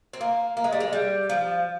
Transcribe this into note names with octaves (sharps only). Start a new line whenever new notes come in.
C4
A#3
A#3
G#3
G3
G#3
G3
F3